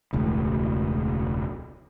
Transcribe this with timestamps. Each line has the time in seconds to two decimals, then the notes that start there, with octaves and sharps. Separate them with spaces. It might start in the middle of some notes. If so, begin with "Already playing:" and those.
0.13 E1 C#2 A2